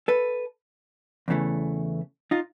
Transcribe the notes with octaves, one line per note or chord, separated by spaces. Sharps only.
A4 B4
E2 C#3 E3 A3
D#4 F4